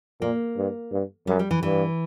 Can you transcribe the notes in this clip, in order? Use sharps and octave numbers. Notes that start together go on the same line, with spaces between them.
A#2 A#3
G2
G2
F#2 G3
G3
E3
G2 E3